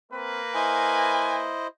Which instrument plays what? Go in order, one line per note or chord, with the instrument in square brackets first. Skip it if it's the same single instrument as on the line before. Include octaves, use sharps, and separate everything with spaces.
[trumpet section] A#3 A#4 B4 [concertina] C4
[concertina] E4 C5 D#5 [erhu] G#5